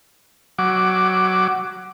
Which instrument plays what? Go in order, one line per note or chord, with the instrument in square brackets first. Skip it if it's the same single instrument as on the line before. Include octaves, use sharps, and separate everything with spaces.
[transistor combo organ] F#3 D6